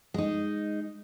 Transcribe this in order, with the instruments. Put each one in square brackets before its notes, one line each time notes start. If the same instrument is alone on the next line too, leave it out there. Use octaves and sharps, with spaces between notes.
[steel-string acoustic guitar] G#3 D#4